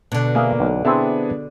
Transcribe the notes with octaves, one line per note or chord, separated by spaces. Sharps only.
B2 D3 D4
A#3 G#4 E5 F5
B1
B3 C4 D4 E4 G#4 E5